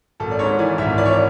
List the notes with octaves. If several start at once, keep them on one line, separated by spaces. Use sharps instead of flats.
G#1 A4
D5
G#2 C#5
E3 D5
G#1 E5
E3 D5
C#5
D5